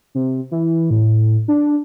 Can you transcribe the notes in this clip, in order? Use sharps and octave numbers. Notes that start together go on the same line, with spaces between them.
C3
E3
A2
D4